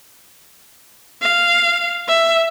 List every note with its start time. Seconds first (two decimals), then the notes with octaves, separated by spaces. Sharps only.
1.22 F5
2.08 E5